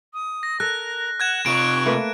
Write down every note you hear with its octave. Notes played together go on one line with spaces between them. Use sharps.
D#6
A#6
A4 A#4 F#6
F#5 F#6 G#6 E7
C3 F4 C#6 D7
A3 A#3 B4